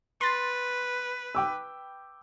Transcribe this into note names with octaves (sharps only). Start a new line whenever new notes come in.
B4 C6 A6
G5 D6 E6